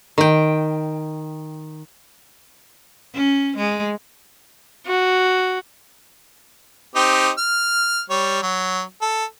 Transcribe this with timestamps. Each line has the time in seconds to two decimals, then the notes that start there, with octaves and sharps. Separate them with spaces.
0.18 D#3 G5
3.14 C#4
3.57 G#3
4.87 F#4
6.95 C4 D#4 G4
7.38 F6
8.10 G3 C#5
8.43 F#3
9.02 A4